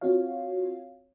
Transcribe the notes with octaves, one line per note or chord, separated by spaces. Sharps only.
C4 F4 F#4 C#5 F5